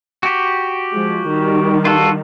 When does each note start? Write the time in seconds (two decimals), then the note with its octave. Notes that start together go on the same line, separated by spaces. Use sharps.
0.23 F#4 G4
0.93 F3 G#3
1.29 D#3 G3
1.85 F4 F#4 A4